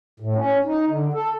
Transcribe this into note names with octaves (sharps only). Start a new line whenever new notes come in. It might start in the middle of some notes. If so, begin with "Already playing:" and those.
A2
C#4
D#4
D3
A4